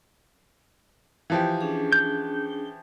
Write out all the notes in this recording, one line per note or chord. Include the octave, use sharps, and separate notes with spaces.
E3 F3 G4
C#4 D4 G#4
G6